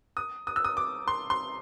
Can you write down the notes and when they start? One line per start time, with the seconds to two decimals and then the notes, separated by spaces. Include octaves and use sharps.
0.17 D#6
0.47 D#6
0.56 E6
0.65 D#6
0.77 D6
1.08 C6
1.30 C6